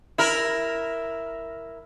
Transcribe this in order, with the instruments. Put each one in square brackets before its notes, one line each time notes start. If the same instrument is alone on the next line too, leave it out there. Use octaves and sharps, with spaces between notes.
[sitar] E4 A#4